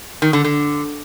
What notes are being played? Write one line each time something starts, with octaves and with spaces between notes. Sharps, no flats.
D#3
D3
D3